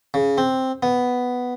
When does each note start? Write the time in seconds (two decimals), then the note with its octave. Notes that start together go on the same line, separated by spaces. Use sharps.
0.14 C#3
0.38 C4
0.83 B3